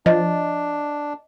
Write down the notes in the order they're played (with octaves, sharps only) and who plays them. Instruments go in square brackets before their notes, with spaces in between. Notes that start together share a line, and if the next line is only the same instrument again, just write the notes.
[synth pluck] F3 [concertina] D4 [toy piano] D#5